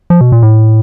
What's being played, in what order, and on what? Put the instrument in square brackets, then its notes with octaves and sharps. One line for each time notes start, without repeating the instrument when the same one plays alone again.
[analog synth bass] F3
B2
A#2
A2